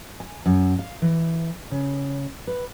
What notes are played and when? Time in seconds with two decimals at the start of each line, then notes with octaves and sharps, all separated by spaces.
0.20 G#5
0.46 F#2
0.79 F5
1.02 E3
1.71 C#3
2.47 B4